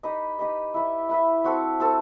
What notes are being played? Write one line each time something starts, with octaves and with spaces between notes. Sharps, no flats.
D#4 G4 B4 D#5
D#4 G4 B4 D#5
E4 B4 E5
E4 B4 E5
C4 F#4 A4
C4 F#4 A4